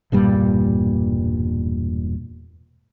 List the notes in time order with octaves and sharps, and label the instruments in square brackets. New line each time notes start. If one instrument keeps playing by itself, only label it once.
[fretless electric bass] E1 G2 A#2 G3